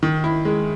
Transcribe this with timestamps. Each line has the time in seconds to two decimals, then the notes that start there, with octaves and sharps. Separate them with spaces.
0.03 D#3
0.24 E4
0.45 G#3